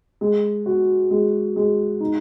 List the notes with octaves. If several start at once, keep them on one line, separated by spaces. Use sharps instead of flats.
G#3
F#4
G#3
G#3
D#4